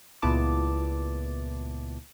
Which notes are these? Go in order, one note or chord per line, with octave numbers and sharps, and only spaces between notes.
C#2 A#2 B3 E4 A5 D6